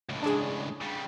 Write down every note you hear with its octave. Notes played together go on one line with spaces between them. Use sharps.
C#2 A2
D4 G#4
C#3 G3